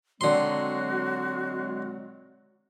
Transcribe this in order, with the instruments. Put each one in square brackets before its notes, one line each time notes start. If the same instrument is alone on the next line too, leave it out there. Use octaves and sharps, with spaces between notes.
[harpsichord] D3 C6 [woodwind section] F#3 G#3 C4 [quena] F#4